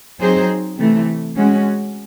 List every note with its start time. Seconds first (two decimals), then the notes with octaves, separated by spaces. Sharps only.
0.20 F#3 C4 D#4 G#4 C5
0.78 C3 E3 A3
1.37 G#3 C#4 F#4